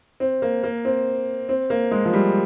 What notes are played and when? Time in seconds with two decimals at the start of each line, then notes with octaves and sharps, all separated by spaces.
0.20 C4
0.42 A#3
0.63 A#3
0.85 C4
1.49 C4
1.70 A#3
1.91 G#3
2.05 F3
2.13 G3